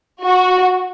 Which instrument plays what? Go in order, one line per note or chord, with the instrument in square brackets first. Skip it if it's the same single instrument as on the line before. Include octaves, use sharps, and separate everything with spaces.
[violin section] F#4